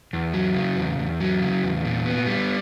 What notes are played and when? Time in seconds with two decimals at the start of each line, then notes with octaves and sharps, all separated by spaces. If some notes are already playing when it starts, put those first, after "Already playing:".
0.13 E2
0.34 F#3
0.56 C#3
0.77 E2
0.98 E2
1.20 F#3
1.41 C#3
1.63 E2
1.85 A#2
2.06 B3
2.27 G3